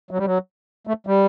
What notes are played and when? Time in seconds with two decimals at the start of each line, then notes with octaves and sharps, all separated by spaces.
0.11 F#3
0.18 G3
0.26 F#3
0.87 A3
1.07 G3